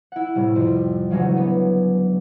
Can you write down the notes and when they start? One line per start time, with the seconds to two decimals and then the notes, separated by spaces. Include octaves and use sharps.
0.12 E4 F#5
0.35 A2 C3 G3 A3
0.55 F2 C3 G3
1.11 D2 C#3 E3 F#3 G#3 A3
1.37 B3